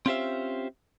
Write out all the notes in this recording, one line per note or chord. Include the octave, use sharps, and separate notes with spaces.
C4 C#4 F4 G4 C5 E5